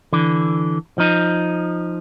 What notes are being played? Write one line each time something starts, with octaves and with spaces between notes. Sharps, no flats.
D3 E3
F3 D#4